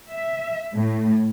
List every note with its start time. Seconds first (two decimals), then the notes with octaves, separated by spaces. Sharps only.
0.11 E5
0.75 A2